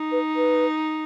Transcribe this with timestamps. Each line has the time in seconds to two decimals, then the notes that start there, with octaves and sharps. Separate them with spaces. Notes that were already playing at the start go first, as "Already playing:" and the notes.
Already playing: D#4
0.12 B4
0.36 B4